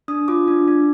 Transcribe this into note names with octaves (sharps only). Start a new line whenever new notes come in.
D4 D#6
F4 D6
D4
D4